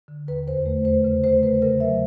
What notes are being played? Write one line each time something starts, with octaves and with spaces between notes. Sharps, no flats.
D3
D#2 B4
E2 C5
A3
A3 C5
C#3
A3 C5
C#3 B4
C#3 A#4
F#3 E5